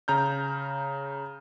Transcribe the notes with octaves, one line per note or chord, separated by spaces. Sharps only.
C#3 A#5 F6 G6